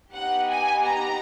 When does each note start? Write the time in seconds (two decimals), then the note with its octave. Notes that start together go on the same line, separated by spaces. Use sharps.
0.13 B3 D#4 G4 F#5
0.49 G#5
0.83 A#5